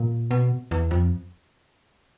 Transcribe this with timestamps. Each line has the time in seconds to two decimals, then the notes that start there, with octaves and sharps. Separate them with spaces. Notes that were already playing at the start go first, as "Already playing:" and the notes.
Already playing: A#2
0.31 B2
0.71 E2
0.91 F2